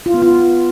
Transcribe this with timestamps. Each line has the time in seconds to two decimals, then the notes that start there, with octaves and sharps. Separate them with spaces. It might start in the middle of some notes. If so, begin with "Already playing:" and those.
0.06 F4
0.14 B3
0.22 F4